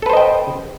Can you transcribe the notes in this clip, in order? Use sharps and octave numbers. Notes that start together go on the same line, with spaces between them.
A4 B4 C5 D#5 G5